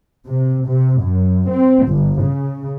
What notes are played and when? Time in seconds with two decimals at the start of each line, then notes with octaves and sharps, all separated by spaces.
0.27 C3
0.68 C3
1.02 F#2
1.50 C4
1.89 G1
2.23 C#3